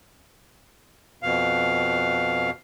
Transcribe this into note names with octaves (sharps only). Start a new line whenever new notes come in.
F2 B2 F5